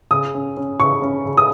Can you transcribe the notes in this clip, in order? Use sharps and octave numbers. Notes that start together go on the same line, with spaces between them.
C#3 D#6
C#4
C#4
C#3 C#6
C#4
C#3
D#6